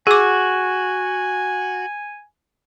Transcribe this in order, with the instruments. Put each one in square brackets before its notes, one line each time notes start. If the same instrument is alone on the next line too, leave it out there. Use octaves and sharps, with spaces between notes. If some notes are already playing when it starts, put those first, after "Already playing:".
[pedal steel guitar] F#4 [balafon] G#4 D6 [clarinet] G#5